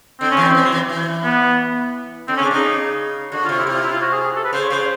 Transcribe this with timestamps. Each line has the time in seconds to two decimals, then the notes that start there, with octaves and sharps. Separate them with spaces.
0.20 D3 C4
0.31 C#4
0.37 E3 C4
0.55 E3
0.63 F#3
0.72 E3
0.89 E3
1.24 B3
2.28 D3 C4
2.37 C#3 C#4
2.45 D4
2.51 C#3 D#4
3.32 D3 F#4
3.45 C3 F4
3.58 E4
3.67 C3 F4
3.82 E4
3.92 F4
4.01 F#4
4.12 G#4
4.24 G#4
4.36 A4
4.44 B4
4.53 C#3 C5
4.62 C#5
4.70 C#3 C5